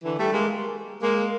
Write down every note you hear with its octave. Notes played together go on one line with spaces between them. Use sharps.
D3 E3
G3 A3
G#3 A#3
G#3 A#3